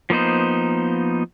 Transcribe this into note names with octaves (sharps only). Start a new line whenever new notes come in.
F3 A#3 B3 D#4 C5